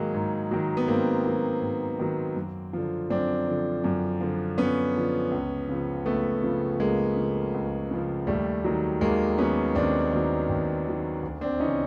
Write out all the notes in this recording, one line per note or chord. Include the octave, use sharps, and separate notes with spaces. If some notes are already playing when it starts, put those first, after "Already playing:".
Already playing: G#2 D#3 F#3 G#3 A#3
G#2
D#3 F#3
B3
G#2 A#3 C4
D#3 F#3
G#2
D#3 F#3
F#2
D3 F3
F#2 C4 D4
D3 F3
F#2
D3 F3
F#2 B3 C#4
D3 F3
C#2
C#3 F3
C#2 A3 B3
C#3 F3
C#2 G#3 A#3
C#3 F3
C#2
C#3 F3
D#2 G3 A3
D#3 F#3
D#2 G#3 A#3
D#3 F#3 B3 C#4
D#2 C4 D4
D#3 F#3
D#2
D#3 F#3
D2
C4 D4
C#3 E3 C#4 D#4